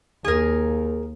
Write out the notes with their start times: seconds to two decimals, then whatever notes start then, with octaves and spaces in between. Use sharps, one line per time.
0.24 D#2 G#4 A#4